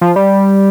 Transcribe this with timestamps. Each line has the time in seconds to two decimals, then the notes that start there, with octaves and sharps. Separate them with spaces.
0.01 F3
0.16 G3